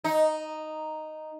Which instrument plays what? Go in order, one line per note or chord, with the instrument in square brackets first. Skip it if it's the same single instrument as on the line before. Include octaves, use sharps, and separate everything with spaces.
[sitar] D#4